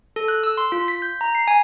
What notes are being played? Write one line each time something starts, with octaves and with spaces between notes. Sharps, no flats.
A4
F#6
E6
C6
F4
B6
G6
A#5
C7
G#5